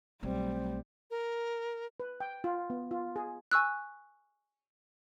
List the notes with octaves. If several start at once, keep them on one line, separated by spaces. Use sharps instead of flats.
B1 G3 A3 C4
A#4
B4
G5
F4
B3
F4
G#4
G#5 C#6 E6 F#6